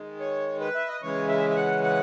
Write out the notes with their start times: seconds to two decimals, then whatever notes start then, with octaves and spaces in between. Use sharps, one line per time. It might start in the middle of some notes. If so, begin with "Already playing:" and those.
Already playing: D#3 G#3
0.20 C#5
0.60 B4
0.75 E5
0.88 D#5
1.02 C#3 E3 G#3 C#5
1.29 E5
1.50 E5
1.56 F#5
1.83 F#5